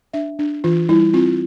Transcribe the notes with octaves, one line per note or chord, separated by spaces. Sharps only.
D4 E5
D4
E3 F4
G3 E4
C4 F4